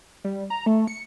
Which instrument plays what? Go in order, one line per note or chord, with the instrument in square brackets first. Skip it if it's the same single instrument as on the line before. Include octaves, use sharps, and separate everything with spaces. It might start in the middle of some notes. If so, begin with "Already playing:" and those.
[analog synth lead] G3
A#5
A3
C#7